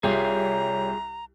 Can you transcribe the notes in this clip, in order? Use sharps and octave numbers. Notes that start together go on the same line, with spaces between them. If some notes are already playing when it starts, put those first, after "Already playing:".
C2 F4 G4 G#4 C#5 A#5